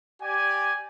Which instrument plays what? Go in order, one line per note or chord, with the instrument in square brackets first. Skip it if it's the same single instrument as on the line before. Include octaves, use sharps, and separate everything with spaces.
[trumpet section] G4 D5 G#5